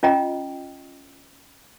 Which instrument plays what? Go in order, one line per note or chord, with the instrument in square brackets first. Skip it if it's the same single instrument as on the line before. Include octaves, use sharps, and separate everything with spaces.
[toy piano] C#4 F4 D#5 G5 A#5